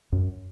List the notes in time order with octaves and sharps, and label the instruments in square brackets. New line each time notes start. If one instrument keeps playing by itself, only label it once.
[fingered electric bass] F#2